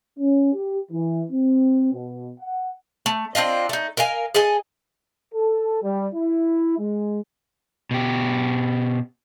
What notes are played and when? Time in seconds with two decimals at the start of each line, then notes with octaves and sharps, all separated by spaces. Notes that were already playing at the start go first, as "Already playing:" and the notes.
0.18 C#4
0.54 G4
0.91 E3
1.31 C4
1.93 B2
2.39 F#5
3.06 A3
3.35 C4 D4 F4 D#5
3.69 A3 D#4
3.97 A#4 D#5 F5 G#5
4.34 G#4 A4 D#5 G#5
5.34 A4
5.83 G3
6.13 E4
6.79 G#3
7.91 B2 G4